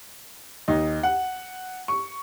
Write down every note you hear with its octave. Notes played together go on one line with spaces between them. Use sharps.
D#2 D#4
F#5
C#6